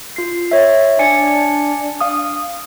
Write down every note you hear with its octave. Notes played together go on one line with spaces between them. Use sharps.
F4 C7
C#5 E5
D4 D5 G#5 C#7
F5 D#6